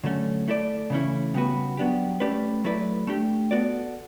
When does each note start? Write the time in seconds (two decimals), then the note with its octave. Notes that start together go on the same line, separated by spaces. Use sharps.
0.04 D3 F#3 A3 C#4
0.48 A3 E4 A4 D5
0.90 C#3 E3 A3 C#4 E4
1.34 C#3 G3 B3 F#4 B4
1.77 F#3 B3 D4 G4
2.20 A3 C#4 G4 B4 D5
2.64 F#3 A3 E4 B4 D5
3.07 A3 D4 G4
3.51 B3 F#4 A4 D5